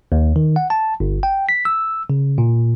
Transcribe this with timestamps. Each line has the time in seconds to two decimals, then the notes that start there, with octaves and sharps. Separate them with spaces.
0.12 D#2
0.36 D#3
0.56 F#5
0.70 A5
1.00 G1
1.23 G5
1.49 B6
1.65 E6
2.10 C#3
2.38 A#2